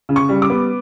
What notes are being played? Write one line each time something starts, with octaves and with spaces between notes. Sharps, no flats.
C#3
C#6
G3
D6
B3